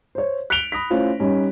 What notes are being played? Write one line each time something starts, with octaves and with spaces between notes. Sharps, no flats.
C5 C#5
F#6 B6 C#7 D7 F7 G7
B5 D#6 A#6 B6
A3 C#4 E4 F4 C5
G3 C#4 D#4